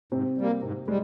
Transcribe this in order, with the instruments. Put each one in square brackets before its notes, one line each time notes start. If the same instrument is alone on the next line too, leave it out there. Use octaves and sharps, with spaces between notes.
[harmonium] G#2 [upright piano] C3 C4
[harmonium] G3 A#3
[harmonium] G#2 [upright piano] C3 C4
[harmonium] G3 [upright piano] G#3